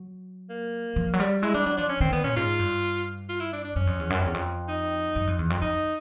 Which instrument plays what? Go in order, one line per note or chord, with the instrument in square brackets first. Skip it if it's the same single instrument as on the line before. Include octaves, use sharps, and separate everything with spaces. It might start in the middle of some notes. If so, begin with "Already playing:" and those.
Already playing: [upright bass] F#3
[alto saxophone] A#3
[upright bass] F3
F#3
G3
[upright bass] G#3 [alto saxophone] E4
[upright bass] G3 [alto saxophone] D4
[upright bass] F#3 [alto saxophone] D4
[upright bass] F3 [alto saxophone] D4
[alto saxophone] C#4
[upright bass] D#3 [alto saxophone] C4
[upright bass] D3 [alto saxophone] B3
[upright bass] A#2 [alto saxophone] C#4
[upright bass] G#2 [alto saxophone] F4
[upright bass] G2
[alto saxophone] F4
E4
D4
D4
[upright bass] F#2 [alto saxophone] C#4
[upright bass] F2
E2
F#2
F2
E2
F2
[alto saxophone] D#4
[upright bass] F#2
F2
E2
F2
[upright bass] F2 [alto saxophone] D#4